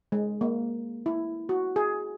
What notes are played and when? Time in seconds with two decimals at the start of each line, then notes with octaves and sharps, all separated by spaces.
0.12 G#3
0.41 A#3
1.06 E4
1.49 F#4
1.76 G#4